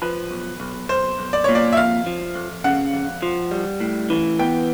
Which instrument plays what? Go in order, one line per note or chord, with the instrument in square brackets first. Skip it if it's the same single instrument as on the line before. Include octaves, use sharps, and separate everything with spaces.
[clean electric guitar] F3 [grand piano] B4
[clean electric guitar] B1
B1
[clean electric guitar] B1 [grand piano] C5
[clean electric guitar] B1
[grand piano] D5
[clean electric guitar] A#2 [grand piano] C#5
[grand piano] D5
E5
[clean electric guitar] F2 [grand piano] F5
[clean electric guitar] F3
F2
[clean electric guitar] C#3 [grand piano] F#5
[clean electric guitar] F2
F3
G3
A2
E3
[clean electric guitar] B3 [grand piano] G5